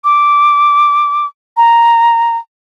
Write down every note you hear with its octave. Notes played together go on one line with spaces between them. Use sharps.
D6
A#5